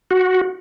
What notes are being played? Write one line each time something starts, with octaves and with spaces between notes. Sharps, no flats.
F#4